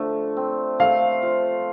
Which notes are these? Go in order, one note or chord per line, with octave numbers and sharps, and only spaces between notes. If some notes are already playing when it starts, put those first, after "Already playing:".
Already playing: D3 F3 A3
C4
A3 F5
F3